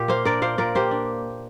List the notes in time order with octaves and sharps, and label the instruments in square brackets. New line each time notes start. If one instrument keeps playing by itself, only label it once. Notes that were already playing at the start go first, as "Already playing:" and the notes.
Already playing: [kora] A#2 G4
A#3 C5 F5
D4 A#4 D5
A#2 C5 F5
A#2 A#4 D5
A#3 G4 C5
D4